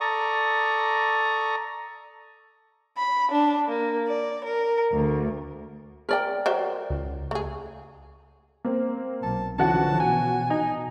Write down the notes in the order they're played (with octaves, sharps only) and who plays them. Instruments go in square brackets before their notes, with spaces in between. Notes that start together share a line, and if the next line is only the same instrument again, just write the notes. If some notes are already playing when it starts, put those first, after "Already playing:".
[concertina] A4 D5 A#5 C#6 D#6
[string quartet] B5
D4
A#3
D5
A#4
D2
[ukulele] A#4 D5 G5
[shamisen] F#3 C5 E5
[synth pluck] C#2
[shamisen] A3 G#4
[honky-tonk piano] A#3 C4
[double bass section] B1 [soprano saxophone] A5
[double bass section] D3 E3 F3 [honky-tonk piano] C#4 F#4 F#5 [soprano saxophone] A5
[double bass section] B2 [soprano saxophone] G#5
[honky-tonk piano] D#4 [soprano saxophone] G#5